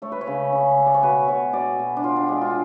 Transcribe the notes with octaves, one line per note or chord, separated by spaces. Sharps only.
A3 C#5
B4
C#5
C#3
C#3
A3
D5
C#5
B2 B4
B2 C#5
B2 D5
B2
D4
A2 F4
D4
G#3 D4
F4